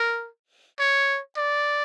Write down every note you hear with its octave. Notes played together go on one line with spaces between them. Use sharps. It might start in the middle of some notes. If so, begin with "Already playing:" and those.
Already playing: A#4
C#5
D5